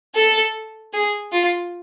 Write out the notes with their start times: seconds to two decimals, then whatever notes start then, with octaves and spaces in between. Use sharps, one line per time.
0.15 A4
0.93 G#4
1.32 F4